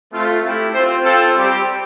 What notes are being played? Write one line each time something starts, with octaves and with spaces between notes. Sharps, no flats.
A3 C4 F4
A3 E4 G4
C4 F4 C5
C4 F4 A4
G3 C4 G4